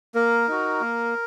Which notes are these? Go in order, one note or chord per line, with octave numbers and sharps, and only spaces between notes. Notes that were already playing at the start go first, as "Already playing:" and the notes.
A#3 A#4
D#4 F#4
A#3